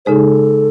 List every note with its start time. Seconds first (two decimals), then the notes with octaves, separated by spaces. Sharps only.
0.06 C#3 G#3 D#4 G#4 A4 C5